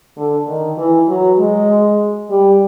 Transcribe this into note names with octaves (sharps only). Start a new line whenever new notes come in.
D3
D#3
E3
F#3
G#3
G3